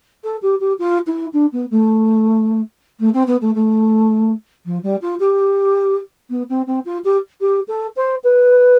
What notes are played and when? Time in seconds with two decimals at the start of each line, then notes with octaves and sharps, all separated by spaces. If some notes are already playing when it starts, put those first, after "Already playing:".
0.24 A4
0.42 G4
0.60 G4
0.79 F4
1.07 E4
1.33 D4
1.52 B3
1.71 A3
3.00 A3
3.14 C4
3.27 B3
3.41 A3
3.55 A3
4.66 F3
4.83 G3
5.02 F4
5.20 G4
6.30 B3
6.49 C4
6.67 C4
6.85 F4
7.04 G4
7.41 G4
7.68 A4
7.96 C5
8.24 B4